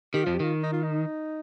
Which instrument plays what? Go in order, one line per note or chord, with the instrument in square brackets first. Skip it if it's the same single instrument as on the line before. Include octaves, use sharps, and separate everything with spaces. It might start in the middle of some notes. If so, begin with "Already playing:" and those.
[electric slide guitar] D#3 [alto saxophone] G4
[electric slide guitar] F2 F3 [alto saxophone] F4
[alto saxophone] G4
[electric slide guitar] D#3 [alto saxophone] F4
[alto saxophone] D#4
F4
D#4